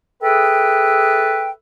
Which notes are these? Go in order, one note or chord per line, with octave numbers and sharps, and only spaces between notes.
G#4 A4 B4 E5 G5